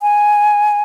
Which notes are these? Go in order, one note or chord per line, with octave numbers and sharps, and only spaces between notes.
G#5